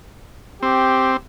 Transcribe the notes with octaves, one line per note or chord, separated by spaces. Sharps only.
C4 G4